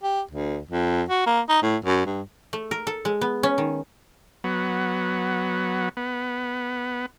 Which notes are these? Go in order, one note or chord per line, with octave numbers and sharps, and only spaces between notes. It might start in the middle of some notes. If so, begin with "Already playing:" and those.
G4
D2
F2
F#4
A#3
D#4
A2
F#2
G2
A3
A#4
A4
G#3
B3
C#4
D#3
F#3 B3
B3